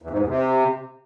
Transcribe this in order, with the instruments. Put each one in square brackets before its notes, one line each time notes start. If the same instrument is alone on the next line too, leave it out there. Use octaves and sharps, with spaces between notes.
[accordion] E2
G#2
E2
C3